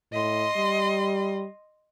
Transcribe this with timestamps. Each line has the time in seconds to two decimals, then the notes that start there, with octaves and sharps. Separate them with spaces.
0.12 A2 D#5 C6
0.56 G3